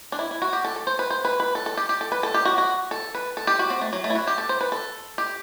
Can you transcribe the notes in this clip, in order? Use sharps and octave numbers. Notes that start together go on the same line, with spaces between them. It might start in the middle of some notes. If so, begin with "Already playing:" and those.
D4
E4
E4
F#4
G4
A4
A4
C5
B4
C5
B4
B4
A4
A4
G4
G4
A4
B4
A4
G4
F#4
F#4
A4
B4
A4
G4
F#4
C4
A3
F#3
A3
E4
F#4
G4
A4
C5
B4
A4
G4